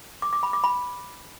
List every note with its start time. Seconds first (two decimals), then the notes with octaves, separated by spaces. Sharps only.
0.22 D6
0.33 D6
0.43 B5
0.53 D6
0.64 B5